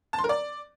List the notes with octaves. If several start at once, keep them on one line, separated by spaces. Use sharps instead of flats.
A5
C6
A#4
D5